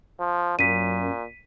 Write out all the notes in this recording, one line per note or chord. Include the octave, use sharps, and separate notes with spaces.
F3
F#2 A#2 B6 D#7